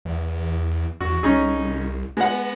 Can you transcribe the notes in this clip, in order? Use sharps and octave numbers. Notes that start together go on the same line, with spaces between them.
E2
E2 F#4
C2 C#4 D#4 G#4
G#3 B3 F#5